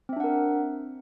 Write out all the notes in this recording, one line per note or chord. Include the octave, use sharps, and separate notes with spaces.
C4 D4 A#4 E5 F#5